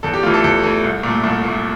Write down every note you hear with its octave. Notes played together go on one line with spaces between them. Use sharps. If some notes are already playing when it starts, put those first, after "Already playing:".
E2 A4
G4
E3 A3 F4
A4
E2 A4
E3 A3
C2
A#2
A3
C2 A4
A#2 A3